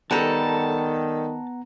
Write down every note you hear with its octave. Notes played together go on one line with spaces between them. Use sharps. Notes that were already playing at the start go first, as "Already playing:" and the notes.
D#3 G3 B3 A4 F#5 A5 A#5